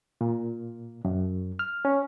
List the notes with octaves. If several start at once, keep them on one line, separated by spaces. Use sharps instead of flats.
A#2
F#2
F6
C#4